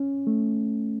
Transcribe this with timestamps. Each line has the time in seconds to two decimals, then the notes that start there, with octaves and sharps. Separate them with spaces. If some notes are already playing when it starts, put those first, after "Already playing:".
Already playing: C#4
0.27 A3